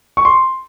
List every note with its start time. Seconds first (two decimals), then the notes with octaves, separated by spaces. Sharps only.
0.17 C#6
0.25 C6